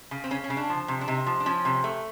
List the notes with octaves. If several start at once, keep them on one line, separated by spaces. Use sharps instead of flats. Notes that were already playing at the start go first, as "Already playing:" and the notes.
C#3
C4
C#3 C#4
C#4
C#3
D4
F3
C3
D4
C3 D#4
F3
D4
F3 C#4
C3
A3